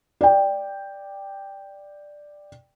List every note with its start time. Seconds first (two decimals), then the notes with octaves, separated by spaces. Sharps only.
0.21 D5 G5